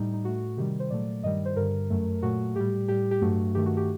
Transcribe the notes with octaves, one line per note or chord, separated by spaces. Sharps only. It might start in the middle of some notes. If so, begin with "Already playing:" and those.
Already playing: A2 G3 D#4
D#4
A2 A3 F#4
C3 D#3 G3 G4
C5
A#2 F#3 A3 D5
G2 D#3 G3 D#5
C5
G2 D3 G3 A#4
F#2 F#3 A3
A#2 F#3 A3 F#4
A2 G3 G4
A2 G3 G4
G4
G2 F#3 A3 F#4
G2 D#3 A3 G4
F#4
G4